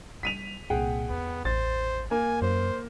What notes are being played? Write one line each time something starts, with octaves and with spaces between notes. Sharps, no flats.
G3 B6 D#7 F7
C2 A#2 G#4 F#5 G5
E2 B3
A1 C5 A6
A#3 G#5
F#2 C5